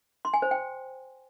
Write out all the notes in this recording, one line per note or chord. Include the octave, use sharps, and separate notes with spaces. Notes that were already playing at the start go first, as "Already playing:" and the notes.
C6
G#5
C5
G5